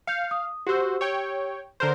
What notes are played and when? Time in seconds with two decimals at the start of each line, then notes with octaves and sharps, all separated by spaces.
0.07 F5 G6 C#7
0.31 D#6
0.67 F#4 G4 C5 E6
1.01 C#5 G5
1.80 D3 A#4 C5 G6